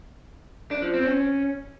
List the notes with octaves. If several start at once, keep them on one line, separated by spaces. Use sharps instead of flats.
D4
F3
C4
C#4